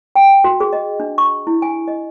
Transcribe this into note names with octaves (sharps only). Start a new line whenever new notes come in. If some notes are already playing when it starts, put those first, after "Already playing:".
G5
F#4
G#4
D#5
D4
C#6
E4
G#5
D#5